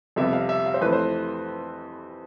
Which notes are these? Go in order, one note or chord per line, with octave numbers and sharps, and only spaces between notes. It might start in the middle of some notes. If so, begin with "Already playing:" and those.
F2 C3 G3 B3 E5
F5
E5
F5
C5
F2 E3 A3 B4
C5